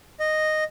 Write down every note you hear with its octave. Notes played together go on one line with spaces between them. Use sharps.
D#5